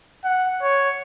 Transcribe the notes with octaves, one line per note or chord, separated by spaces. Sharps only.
F#5
C#5